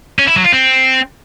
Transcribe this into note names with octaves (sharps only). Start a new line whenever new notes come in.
C#4
E4
F#3
F4
C4